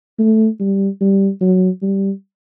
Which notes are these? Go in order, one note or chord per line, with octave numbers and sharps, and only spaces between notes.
A3
G3
G3
F#3
G3